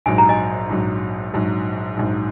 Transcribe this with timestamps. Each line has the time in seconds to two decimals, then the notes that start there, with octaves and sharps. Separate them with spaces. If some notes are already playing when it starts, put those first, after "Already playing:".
0.06 A#1 G#2 F#3 G#5
0.18 A#5
0.29 D#5 G#5
0.69 A#1 G#2 F#3
1.34 A#1 G#2 F#3
1.97 A#1 G#2 F#3